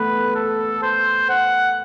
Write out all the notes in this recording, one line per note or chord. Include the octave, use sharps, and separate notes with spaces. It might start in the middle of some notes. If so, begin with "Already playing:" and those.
Already playing: A3 B3 B4
A4
C5
F#5